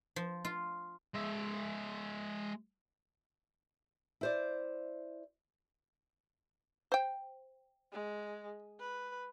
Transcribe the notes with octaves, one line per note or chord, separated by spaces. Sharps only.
F3
F4
G#3 E5
E4 C5 D5
C5 G5
G#3
B4